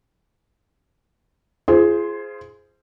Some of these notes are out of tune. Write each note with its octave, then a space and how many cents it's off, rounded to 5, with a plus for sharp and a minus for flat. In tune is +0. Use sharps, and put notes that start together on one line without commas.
F4 -35 G#4 +10 C5 +0